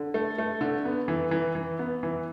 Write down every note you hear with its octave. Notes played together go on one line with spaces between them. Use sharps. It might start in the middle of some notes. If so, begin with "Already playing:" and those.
Already playing: D3
A3
A3
D3
B3
E3
E3
E3
B3
E3